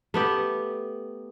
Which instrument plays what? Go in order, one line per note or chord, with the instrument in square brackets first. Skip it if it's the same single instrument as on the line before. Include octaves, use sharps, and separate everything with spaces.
[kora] A3 B3 G4